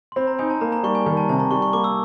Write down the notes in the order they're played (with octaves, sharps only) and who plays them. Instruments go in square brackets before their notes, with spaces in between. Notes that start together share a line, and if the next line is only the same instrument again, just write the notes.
[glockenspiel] C6
[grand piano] C4 [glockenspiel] B5
[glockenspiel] A#5
[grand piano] D#4 [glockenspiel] G#5
[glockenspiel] A5
[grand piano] A#3 [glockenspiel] A#5
[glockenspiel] A#5
[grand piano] G3 [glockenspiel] C#6
[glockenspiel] G#5
[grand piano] D#3 [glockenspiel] G#5
[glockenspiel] A5
[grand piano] C3 [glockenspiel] A5
[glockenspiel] A#5
[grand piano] G3 [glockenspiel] C#6
[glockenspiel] C#6
[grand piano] A#3 [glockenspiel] D6
[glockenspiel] E6